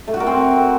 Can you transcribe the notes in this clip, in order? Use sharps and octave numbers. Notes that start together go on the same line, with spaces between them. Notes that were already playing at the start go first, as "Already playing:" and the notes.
A3
F#4
A#4
C4